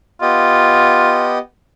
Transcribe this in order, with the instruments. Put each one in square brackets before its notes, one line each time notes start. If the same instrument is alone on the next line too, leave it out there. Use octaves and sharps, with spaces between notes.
[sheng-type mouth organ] B3 G4 D#5 [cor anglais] F4